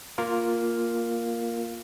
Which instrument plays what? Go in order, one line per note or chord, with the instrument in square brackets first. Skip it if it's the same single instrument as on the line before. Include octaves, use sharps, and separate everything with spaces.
[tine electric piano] A#3 F4 A#4